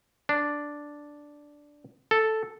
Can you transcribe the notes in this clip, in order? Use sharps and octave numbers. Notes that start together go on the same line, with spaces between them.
D4
A4